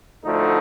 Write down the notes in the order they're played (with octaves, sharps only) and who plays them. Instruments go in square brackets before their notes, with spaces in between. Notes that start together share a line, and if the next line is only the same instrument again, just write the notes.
[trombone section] D2 D3 F3 A3 D#4